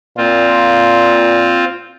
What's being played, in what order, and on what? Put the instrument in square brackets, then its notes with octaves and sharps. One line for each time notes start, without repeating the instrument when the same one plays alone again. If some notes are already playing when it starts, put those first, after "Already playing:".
[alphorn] A#2 [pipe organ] C4 F4